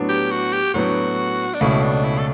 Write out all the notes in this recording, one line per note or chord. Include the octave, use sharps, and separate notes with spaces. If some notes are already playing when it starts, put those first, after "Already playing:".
Already playing: A2 F#3 B3 D4
G4
F#4
G4
A2 F#3 B3 D4 F#4
D4
C#2 B2 A3 C#4 E4
D4
E4
A4